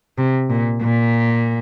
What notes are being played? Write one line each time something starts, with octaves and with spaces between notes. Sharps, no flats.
C3
A#2
A#2